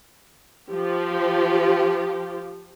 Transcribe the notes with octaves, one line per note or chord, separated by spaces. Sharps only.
F3 G4